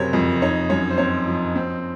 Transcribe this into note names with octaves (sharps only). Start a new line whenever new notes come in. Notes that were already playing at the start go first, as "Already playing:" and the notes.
Already playing: F#1 C3 F#3 C5 C#5
F2
D#4 C#5
F#2 C#5
C5
C4 C#5
F3
C4